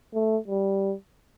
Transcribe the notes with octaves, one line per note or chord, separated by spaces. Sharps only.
A3
G3